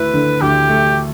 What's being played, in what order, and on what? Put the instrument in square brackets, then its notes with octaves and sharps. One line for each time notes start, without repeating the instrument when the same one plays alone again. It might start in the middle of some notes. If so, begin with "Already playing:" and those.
Already playing: [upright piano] D2 A3 E4 [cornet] B4
[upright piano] D3
[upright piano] D2 [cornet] G4
[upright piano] A3